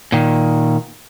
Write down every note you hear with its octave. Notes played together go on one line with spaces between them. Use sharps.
A#2 D#3